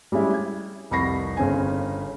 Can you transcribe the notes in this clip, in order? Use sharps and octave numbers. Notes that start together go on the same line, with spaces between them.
G3 G#3 C#4 E4
G#6
F1 C2 B5 C#6 A#6 C7
G1 C#3 C4 G#5